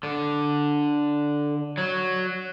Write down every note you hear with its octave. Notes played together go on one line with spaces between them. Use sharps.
D3
F#3